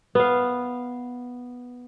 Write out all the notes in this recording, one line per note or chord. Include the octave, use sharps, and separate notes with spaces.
B3 F5